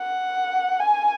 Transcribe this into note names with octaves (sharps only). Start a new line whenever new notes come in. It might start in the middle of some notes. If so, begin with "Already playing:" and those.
Already playing: F#5
G#5